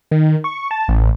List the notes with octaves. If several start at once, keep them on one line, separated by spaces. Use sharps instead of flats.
D#3
C#6
A5
A1